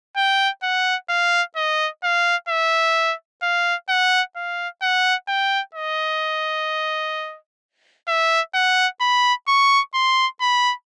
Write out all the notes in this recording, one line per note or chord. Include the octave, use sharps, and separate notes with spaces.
G5
F#5
F5
D#5
F5
E5
F5
F#5
F5
F#5
G5
D#5
E5
F#5
B5
C#6
C6
B5